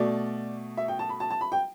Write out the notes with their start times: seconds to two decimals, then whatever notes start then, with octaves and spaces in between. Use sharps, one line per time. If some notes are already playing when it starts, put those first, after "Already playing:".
Already playing: B2 A3 D5
0.77 E5
0.88 G5
0.99 A5
1.09 B5
1.20 A5
1.30 A5
1.41 B5
1.52 G5